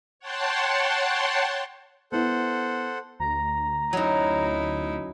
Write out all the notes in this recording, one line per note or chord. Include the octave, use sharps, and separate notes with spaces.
C#5 F#5 G5 A5 C6
B3 E4 A4 C5 F#5
D2 A#5
F#2 F#3 D#4 E4